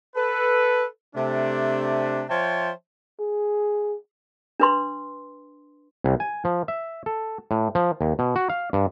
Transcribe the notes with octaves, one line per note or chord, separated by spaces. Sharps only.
A4 B4
C3 A3 D4
F3 C5 C#5 E5 G5 A5
G#4
D4 B4 C6
C2
G#5
F3
E5
A4
A2
F3
D#2
B2
F#4
F5
G2